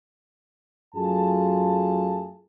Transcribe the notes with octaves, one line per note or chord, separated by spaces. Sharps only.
F#2 F#3 A3 F4 G#4 A5